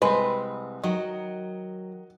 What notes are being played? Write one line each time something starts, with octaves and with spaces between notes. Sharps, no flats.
C2 G#3 C4 B4
D#3 F#3 D#5